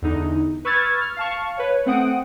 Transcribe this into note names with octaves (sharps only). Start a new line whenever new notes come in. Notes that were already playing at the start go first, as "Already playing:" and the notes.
E2 D3 D#4
B4 C#6 E6 F6 G#6 A6
F6
F5 A5 C#6
B4 C#5
A3 C4 F#5 D#6 D7